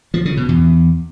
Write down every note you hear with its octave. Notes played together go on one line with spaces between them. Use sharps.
F3
C#3
B2
E2